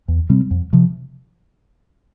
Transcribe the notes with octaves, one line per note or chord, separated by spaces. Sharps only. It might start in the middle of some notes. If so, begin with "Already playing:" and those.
E2
C3 G3 C4
F2
C3 F3